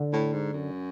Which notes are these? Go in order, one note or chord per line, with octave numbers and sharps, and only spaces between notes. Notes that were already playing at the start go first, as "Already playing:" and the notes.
Already playing: D3
A2
G#2
F#2